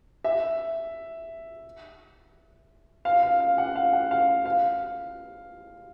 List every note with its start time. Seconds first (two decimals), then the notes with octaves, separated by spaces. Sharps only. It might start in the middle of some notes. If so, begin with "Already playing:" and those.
0.24 E5
3.05 F5
3.23 F5
3.40 F5
3.58 F#5
3.76 F5
3.93 F#5
4.11 F5
4.46 F5